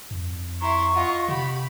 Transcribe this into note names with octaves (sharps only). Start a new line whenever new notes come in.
F2
E4 A#5 C6 C#6
F4 D#5 F#5
C3 G4 B5